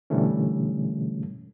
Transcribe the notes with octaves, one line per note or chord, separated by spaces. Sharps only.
B2 D3 E3 G3 A3 C#4